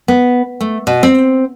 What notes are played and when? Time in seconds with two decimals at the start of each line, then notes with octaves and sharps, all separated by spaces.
0.08 B3
0.61 A3
0.87 B2
1.03 C4